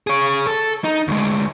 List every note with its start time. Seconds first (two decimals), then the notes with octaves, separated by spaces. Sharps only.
0.07 G#4 C#5
0.47 A4
0.84 D#4
1.08 D2 G#3